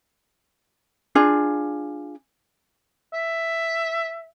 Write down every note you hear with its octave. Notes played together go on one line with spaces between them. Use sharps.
D4 F4 G#4
E5